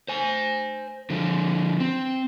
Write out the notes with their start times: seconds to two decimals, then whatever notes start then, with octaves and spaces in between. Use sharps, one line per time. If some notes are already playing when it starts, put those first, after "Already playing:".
0.08 C5 G#5
1.10 D3 F3
1.80 C4